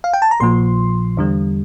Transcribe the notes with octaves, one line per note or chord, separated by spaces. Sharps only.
F5
G5
A5
A#5
A#1 A#2 F3 C6
E2 D3 G3